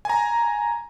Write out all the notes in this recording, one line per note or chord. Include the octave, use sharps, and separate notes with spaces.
G#5 A#5